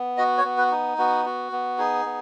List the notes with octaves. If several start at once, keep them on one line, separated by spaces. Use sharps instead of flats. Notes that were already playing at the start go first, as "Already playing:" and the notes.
Already playing: B3
F#4 D#5
C#5
B3
B4
D#4
B3 F#4
F#4
B3
D#4 G#4
B3